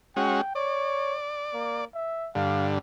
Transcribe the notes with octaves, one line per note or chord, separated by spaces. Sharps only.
G#3 C#4 F#4 G5
C#5 D5
A#3
E5
G2 D3 F5